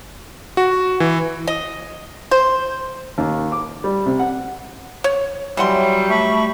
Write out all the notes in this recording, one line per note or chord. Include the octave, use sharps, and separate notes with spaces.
F#4
E3
D#5
C5
D#2
D6
G3
C3
F#5
C#5
E3 F#3 G3 C#5 E5 F#5 G5 C6
A3 E5 A5 B5 C#6